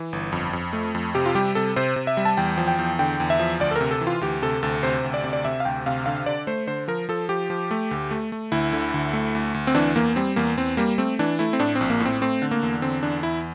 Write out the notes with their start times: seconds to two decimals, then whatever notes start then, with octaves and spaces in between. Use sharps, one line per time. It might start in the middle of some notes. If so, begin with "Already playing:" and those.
Already playing: E3
0.13 G1
0.32 F2
0.53 F2
0.73 A3
0.95 F2
1.15 C3 G4
1.26 F4
1.35 G3 G4
1.55 C3 A4
1.76 C3 C5
1.96 C3
2.07 E5
2.17 G3
2.25 A5
2.37 E2 G5
2.58 F3
2.68 G5
2.79 E2
2.99 D3 G5
3.20 E2
3.30 E5
3.39 F3
3.60 D2 D5
3.71 A4
3.76 A#4
3.81 C3
3.91 A4
4.01 E3
4.07 F4
4.21 D2 G4
4.42 C3 A4
4.63 D2 A4
4.83 C3 C5
5.04 D2
5.14 D5
5.24 C3
5.33 D5
5.45 C3 E5
5.60 F5
5.65 D2 G5
5.86 C3 F5
6.06 D3 F5
6.26 D3 D5
6.47 A3 C5
6.67 D3 C5
6.88 F3 A#4
7.09 F3 A4
7.29 F3 G4
7.50 F3
7.71 A3
7.91 D2
8.11 A3
8.32 A3
8.52 D2 E4
8.73 D3
8.94 D2
9.13 A3
9.35 D2
9.54 D2
9.67 C4
9.75 E3 D4
9.96 E2 A#3
10.16 G3 C4
10.36 E2 A#3
10.57 E2 C4
10.77 G3 A#3
10.98 A3 C4
11.19 E3 D4
11.39 A3 E4
11.53 C4
11.59 A2 D4
11.75 C4
11.81 A#1
11.90 A#3
12.00 A2
12.05 C4
12.21 A3 C4
12.42 D3
12.51 A#3
12.63 E2
12.82 D3 C4
13.03 E2 D4
13.23 E2 E4